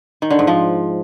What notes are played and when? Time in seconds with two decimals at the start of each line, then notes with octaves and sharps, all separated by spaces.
0.22 D#3
0.30 D3
0.39 G#2
0.47 F3